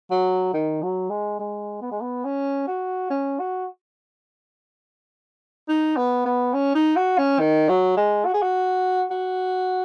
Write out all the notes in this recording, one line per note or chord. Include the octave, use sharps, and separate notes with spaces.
F#3
D#3
F#3
G#3
G#3
B3
G#3
B3
C#4
F#4
C#4
F#4
D#4
B3
B3
C#4
D#4
F#4
C#4
D#3
F#3
G#3
F#4
G#4
F#4
F#4